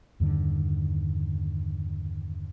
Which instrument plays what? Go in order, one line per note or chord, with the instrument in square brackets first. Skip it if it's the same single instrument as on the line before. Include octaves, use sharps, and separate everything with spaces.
[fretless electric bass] E2 G2 D3 D#3